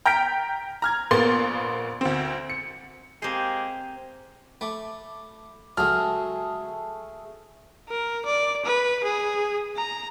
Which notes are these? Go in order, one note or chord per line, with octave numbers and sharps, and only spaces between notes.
G5 A#5 F6 G6 B6 D7
A#5 F6 G#6
A#1 A#3 B3 C6 A6
D2 C4
C#7
G#3 A#3 C4 G4 C5
A3 B5 D6
C#2 F#3 A3 G#4 F6
A#4
D5
B4
G#4
A#5